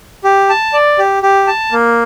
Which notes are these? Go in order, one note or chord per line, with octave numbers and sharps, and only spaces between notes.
G4
A5
D5
G4
G4
A5
A#3